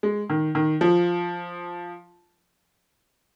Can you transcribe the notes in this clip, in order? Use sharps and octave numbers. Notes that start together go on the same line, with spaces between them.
G#3
D#3
D#3
F3